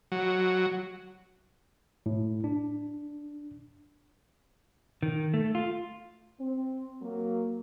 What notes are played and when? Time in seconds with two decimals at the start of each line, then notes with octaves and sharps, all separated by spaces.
0.12 F#3
2.06 A2
2.44 D4
5.03 D#3
5.34 A3
5.55 F4
6.40 C4
7.01 F#3 A#3